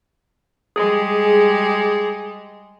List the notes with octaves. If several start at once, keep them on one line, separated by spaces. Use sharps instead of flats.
G3 G#3 G#4